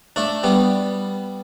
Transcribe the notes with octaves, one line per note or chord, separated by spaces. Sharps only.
A3 D4
G3 B3